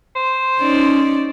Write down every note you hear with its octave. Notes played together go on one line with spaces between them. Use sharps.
C5
C#4 D#4 D5